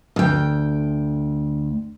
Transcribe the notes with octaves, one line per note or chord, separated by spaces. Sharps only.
D2 G5